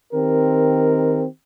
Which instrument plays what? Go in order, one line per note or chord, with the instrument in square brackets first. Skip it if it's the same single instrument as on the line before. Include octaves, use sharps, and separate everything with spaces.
[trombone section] D#3 C4 G4 A#4